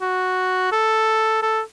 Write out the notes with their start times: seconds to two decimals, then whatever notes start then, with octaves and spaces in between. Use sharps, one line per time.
0.02 F#4
0.72 A4
1.43 A4